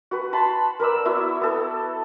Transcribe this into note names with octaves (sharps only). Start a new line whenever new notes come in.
F#4 B4
A5 B5 C6
A#4 B4 D5 E6
B3 E4 F#4 E5
B3 A4